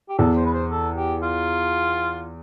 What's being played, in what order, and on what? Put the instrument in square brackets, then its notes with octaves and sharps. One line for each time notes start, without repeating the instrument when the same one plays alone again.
[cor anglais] G4
[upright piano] E2 [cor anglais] A4
[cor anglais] C5
B4
C5
A4
G4
F4